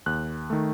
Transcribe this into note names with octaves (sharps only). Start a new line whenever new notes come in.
D#2 F#6
D#3 A3